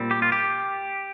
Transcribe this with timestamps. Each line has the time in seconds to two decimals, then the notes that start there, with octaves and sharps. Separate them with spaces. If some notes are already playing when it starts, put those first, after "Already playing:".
Already playing: A#2 G3 C4
0.11 G4
0.22 F4
0.32 G4